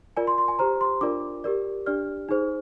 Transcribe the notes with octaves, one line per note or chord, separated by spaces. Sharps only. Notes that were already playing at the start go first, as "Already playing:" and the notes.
F4 A#4 D5 G#5
C6
C6
G#5
G4 C5 A#5
C6
D4 F4 A#4 D5 D6
G4 A#4 D5
D4 G4 D5 F6
D#4 G#4 C5